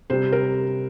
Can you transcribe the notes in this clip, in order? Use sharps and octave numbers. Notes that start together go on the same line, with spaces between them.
C3 G3 C5
A#4